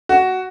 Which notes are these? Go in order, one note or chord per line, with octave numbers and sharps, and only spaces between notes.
F#4